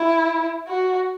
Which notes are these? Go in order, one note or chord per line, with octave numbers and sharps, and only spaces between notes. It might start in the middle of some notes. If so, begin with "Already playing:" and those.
Already playing: E4
F#4